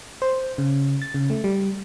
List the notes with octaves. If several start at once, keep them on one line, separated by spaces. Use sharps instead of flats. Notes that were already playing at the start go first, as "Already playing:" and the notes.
C5
C#3
A6
C#3
A3
G3